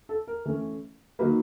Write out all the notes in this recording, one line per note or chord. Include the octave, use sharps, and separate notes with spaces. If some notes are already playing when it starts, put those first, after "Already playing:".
A4
A#4
E3 A3 C#4
D#3 F#3 A#3 B4